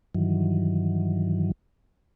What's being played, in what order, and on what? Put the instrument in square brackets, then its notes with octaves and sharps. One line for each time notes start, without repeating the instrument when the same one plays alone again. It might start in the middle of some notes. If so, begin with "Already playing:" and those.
[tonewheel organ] G2 D#3 E3 F#3